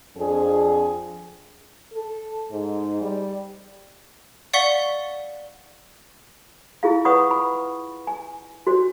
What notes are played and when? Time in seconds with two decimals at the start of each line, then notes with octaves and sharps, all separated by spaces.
0.16 F2 F3 C4 D4 G#4
1.93 A4
2.51 G#2
3.01 G3
4.54 D5 F5 F#5 C#6 B6 G7
6.83 E4 F4 G#4 F5
7.05 B4 C#5 F#5 B5 C#6 D#6
7.31 B5
8.07 G#5
8.67 F#4 C5 C#5